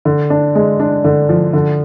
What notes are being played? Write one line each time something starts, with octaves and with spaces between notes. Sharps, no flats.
D3
D4
G#3
D4
D3
F3
D3